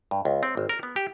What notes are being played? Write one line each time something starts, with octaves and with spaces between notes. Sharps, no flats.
G2
C#2
C4
G#1
A#4
B3
G4